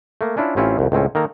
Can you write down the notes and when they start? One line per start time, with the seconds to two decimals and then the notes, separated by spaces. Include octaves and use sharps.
0.21 A3 A#3
0.37 C#4 D4 E4 F4
0.56 A1 C4 C#4 E4 F4
0.79 C2 F2
0.92 C#2 A2 C4 C#4
1.15 D#3 A#3 A4 A#5